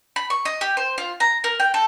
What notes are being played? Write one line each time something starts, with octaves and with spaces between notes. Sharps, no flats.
B5
C#6
D#5
G4
C5
F4
A#5
A#4
G5
A4